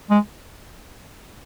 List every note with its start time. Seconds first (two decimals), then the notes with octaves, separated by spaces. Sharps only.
0.10 G#3